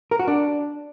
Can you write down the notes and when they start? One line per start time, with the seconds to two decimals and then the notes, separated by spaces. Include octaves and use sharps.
0.11 A#4
0.19 F#4
0.28 D4